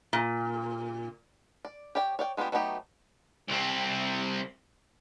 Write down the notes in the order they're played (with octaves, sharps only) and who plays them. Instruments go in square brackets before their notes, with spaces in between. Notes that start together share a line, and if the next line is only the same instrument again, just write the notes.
[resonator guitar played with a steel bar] A#2
[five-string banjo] D5
G4 C#5 D5 G5
C#5 D5 G5
G#3 B3 D4 F4 G4
F#3 A3 B3 D#4 G4
[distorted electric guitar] C2 C4